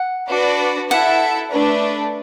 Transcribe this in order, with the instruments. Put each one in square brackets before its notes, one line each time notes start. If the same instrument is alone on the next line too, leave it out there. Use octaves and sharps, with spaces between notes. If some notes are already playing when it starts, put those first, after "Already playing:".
Already playing: [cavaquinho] F#5
[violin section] D4 F#4 B4 D5
[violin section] E4 A4 E5 A5 [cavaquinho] F#5
[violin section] A3 D4 B4